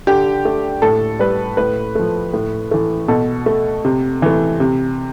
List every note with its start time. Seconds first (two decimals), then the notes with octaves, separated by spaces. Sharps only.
0.07 D3 G4
0.45 A3
0.82 A2 A4
1.19 G3 B4
1.57 A2 B4
1.95 F3 A3
2.34 A2
2.71 E3 A3
3.08 B2 A4
3.46 A3
3.85 C3
4.22 E3 A3
4.60 C3